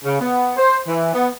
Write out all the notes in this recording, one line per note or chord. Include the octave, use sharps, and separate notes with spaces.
C#3
B3
C5
E3
B3